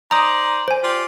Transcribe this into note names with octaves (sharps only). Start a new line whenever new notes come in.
D#4 C5 D5 A#5 D#6
C5 G#5
F4 G4 D5